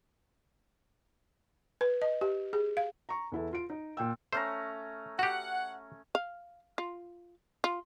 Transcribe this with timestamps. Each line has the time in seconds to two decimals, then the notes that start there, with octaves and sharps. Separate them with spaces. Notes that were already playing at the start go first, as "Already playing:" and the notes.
1.81 B4
2.02 D#5
2.21 G4
2.53 G#4
2.77 F5
3.09 A#5 C#6
3.32 E2 E4 A4
3.53 F4 D7
3.70 D#4
3.97 A#2 G5 E6
4.33 A3 C#4 C5 A#5
5.19 F#4 G4 F#5
6.15 F5
6.78 F4
7.64 F4